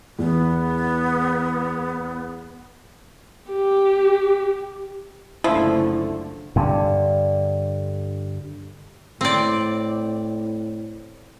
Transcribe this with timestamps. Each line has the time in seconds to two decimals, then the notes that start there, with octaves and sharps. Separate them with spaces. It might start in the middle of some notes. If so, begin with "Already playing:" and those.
0.19 E2 B3
3.50 G4
5.44 F#1 D3 F3 A3 E4
6.56 G2 D3
9.21 A2 C4 D5